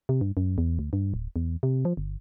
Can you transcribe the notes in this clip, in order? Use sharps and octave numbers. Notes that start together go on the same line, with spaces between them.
C3
G2
F#2
E2
D2
G2
D1
E2
C3
F3
G1